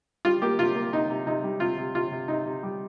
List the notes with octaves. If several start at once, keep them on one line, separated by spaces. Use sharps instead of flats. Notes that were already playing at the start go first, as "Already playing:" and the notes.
G3 F4
A#3 G4
C3 F4
A#3
C3 D#4
C3
C3 D#4
G3
C3 F4
C3
C3 F4
C3
C3 D#4
C3
G3